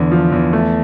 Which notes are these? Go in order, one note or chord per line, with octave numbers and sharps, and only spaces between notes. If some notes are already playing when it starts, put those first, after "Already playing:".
Already playing: E2 D3
F3
E2
A3